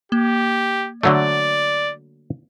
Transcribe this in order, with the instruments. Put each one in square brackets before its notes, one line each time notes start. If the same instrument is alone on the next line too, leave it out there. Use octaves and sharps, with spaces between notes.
[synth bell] A#3 [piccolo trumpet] G4
[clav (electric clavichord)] D3 F#3 A3 [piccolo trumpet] D5